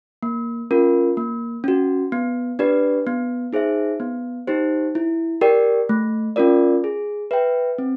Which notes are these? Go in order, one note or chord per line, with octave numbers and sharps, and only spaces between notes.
A#3
C#4 F4 A#4
A#3
C#4 F#4
B3
D4 G4 B4 D5
B3
D#4 G#4 C5 E5
B3
D#4 G4 C5
E4
G4 A#4 D5 G5
A3
C#4 F4 A#4 D5
G#4
B4 E5 G5
C4